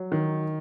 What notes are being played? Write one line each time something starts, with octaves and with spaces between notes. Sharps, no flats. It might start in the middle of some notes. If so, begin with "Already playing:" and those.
Already playing: F#3
D#3